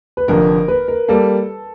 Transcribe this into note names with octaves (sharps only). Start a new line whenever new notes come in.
B4
F1 F2 D3 A#4
B4
A#4
G3 A#3 A4